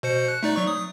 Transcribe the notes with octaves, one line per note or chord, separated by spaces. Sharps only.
B2 C5 C#7
F#6
A3 D#4 D5
F#3 C#6
D#6